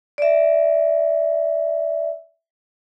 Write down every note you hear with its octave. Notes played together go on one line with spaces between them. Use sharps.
D5 E5